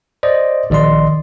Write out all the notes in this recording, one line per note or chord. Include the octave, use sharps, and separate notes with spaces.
C5 D5 D#5
A#1 D#3 D5 D#5 C6